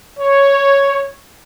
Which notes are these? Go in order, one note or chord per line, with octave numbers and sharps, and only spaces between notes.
C#5